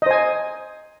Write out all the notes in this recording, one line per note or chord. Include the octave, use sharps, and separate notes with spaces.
C5 D#5 G#5